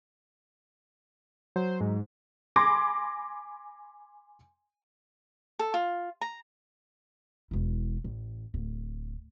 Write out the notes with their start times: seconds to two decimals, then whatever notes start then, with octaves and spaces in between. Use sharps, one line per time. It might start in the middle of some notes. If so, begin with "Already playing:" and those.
1.56 F#3 C5
1.81 G#2
2.56 G#5 B5 C6 D6 G#6 A#6
5.59 A4
5.74 F4
6.21 A#5
7.51 E1 E4
8.04 A1
8.54 D1